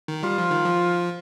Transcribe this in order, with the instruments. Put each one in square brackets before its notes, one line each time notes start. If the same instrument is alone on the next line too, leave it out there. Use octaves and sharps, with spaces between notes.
[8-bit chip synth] D#3
[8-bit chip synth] G3 [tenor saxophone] F4
[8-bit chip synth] F3
D#3
F3